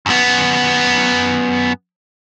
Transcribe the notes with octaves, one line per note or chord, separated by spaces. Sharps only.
F#2 B3